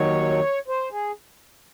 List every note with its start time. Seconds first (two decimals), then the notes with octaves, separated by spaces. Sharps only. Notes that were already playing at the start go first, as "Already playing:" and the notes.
Already playing: D#2 D#3 F#3 C#5
0.68 C5
0.91 G#4